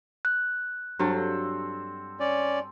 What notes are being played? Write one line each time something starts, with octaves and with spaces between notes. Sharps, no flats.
F#6
G2 F#3 C4 A4 F5
C#4 D5